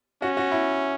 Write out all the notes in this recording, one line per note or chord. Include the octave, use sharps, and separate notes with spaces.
C#4 F#4
F#4
E4